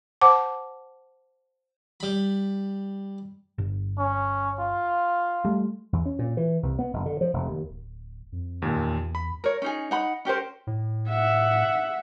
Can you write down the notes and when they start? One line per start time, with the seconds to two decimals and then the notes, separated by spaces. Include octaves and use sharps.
0.22 C5 F#5 A5 D6
2.00 G3 B5
3.58 G1
3.98 C#4
4.60 F4
5.45 G3 A3
5.93 E2
6.06 C#4
6.19 A#2
6.37 E3
6.63 C2
6.79 B3
6.93 F#1
7.06 D3
7.21 F3
7.33 F1
7.47 D#2
7.69 D1
8.32 F2
8.62 D#2 A#2
8.77 E2
9.15 B5
9.44 A#4 C#5
9.62 C#4 D#4 G#4
9.91 D#4 F#5 B5
10.25 C#4 G4 A#4 C5
10.67 A2
11.09 E5 F#5